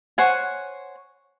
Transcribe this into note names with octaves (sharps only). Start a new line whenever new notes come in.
C5 C#5 F#5 G#5